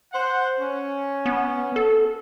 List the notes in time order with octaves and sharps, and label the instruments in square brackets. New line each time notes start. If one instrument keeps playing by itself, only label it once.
[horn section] C5 F#5
C#4
[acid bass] B3
A4